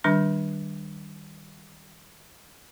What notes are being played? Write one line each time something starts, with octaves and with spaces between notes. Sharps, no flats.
D#3 G3 D4 C6